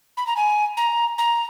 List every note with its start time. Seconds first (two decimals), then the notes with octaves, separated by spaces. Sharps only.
0.17 B5
0.27 A#5
0.37 G#5
0.77 A#5
1.18 A#5